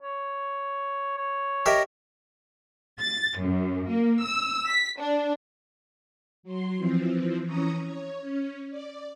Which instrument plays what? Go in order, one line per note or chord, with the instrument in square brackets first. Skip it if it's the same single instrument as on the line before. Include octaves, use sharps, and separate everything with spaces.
[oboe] C#5
C#5
[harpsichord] G4 A#4 E5 [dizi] D#5
[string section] A6
F#2
A#3
E6
B6
D4
[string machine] F#3 C6
E3 F3 C4
E3 C#4 A#5 C#6 D#6
C#5
C#4
D5